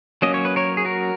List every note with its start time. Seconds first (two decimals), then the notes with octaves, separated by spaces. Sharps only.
0.22 F#3 A#3 C#4 D#5
0.34 C#5
0.45 B4
0.56 A#4 C#5
0.77 G#4
0.85 F#4 A#4